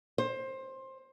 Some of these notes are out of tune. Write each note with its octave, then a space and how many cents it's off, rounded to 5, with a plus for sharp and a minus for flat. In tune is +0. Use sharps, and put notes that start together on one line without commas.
C5 +20